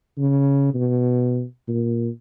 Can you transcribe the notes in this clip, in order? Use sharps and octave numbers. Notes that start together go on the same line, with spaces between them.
C#3
B2
A#2